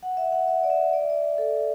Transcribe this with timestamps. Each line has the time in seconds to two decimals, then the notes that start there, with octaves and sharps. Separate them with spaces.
0.03 F#5
0.17 E5
0.32 F#5
0.48 E5
0.63 D5
0.70 E5
0.93 D5
1.01 E5
1.10 D5
1.38 A4